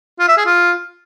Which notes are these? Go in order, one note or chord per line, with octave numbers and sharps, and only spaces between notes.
F4
E5
G#4
F4